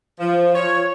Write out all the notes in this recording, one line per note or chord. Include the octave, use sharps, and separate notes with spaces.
F3
C#5